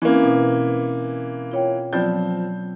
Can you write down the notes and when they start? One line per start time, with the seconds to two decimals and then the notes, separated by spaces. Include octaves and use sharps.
0.02 E3 A#3 C4 C#4
0.23 B2 B4
1.51 F4 C#5 G5
1.93 F3 F#3 B3 C4 D5 G6